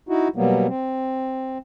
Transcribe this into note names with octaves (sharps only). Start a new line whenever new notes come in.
D#4 E4 F#4
B2 F#3 G3 A#3 B3
C4